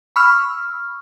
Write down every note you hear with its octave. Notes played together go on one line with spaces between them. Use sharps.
B5 C#6 E6 F6